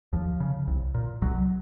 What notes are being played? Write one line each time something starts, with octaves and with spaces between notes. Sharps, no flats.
D#2 F3
C#3
C2
A#2
C2 F#3